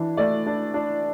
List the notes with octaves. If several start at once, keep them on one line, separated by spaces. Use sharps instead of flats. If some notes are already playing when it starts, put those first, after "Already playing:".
Already playing: E3 D4
A3 D5
D4
D4